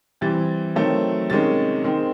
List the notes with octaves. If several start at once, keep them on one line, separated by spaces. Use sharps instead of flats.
E3 G3 C4 A6
D#3 F#3 A3 C4
C3 D#3 G#3 C#4 A6
D#3 G#3 C4